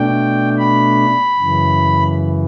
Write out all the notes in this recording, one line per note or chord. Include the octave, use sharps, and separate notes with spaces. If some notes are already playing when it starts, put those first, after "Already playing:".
Already playing: B2 A3 D4 G5
B5
F#2 C#3 E3